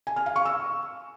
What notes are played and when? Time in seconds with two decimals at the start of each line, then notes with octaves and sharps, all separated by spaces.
0.07 G#5
0.16 F6
0.26 F5
0.36 C#6
0.45 E6